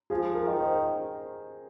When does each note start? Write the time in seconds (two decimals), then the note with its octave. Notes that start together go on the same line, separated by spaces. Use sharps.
0.10 F3 G#4
0.35 A#4
0.47 D#3
0.60 C5